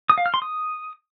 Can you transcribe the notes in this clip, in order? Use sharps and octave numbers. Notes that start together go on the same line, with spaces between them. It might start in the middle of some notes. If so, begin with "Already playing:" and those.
D#6
F5
F6
C6
D#6